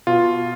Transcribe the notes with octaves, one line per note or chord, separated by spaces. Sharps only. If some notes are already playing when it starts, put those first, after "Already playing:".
B2 F4